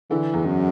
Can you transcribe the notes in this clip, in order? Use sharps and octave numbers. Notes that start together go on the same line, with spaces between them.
D3 E3
E2
F#2